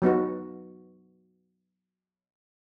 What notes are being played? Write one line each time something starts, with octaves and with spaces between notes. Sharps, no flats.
F#3 B3 D#4 F#4